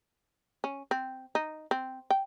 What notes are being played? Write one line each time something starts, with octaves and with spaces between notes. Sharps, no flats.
C#4
C4
D#4
C4
G5